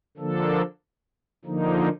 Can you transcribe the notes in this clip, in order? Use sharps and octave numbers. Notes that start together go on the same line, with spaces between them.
D3 F3 A#3 D4 A4
D3 F3 A#3 D#4